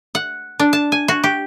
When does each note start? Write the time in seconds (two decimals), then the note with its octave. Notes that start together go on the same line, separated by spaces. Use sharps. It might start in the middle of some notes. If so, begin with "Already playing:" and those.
0.15 F#5
0.60 D4
0.73 A5
0.92 G#5
1.08 F#4
1.24 G4